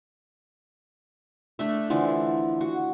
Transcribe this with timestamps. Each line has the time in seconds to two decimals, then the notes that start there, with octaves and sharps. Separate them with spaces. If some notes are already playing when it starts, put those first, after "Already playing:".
1.59 A3 D4 E5
1.90 D3 E3 F3
2.61 F#4